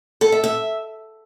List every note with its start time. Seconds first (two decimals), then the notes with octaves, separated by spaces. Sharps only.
0.21 A4
0.32 E5
0.44 E5